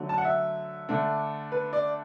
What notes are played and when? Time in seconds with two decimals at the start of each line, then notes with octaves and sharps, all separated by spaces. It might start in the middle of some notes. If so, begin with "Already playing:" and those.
Already playing: D3 F#3 A3
0.09 A5
0.18 F#5
0.25 E5
0.89 D3 A3 D4
1.52 B4
1.73 D5